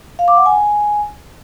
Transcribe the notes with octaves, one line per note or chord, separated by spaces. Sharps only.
F5
D6
F#5
G#5